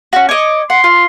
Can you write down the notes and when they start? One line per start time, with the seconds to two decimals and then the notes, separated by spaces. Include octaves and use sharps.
0.13 C#4 F#4
0.29 C#5 D#5 D6
0.70 F#5 C6
0.84 F4